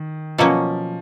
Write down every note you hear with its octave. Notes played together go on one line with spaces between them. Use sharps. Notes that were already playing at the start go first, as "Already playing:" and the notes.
Already playing: D#3
B2 F3 F#3 A#3 C#4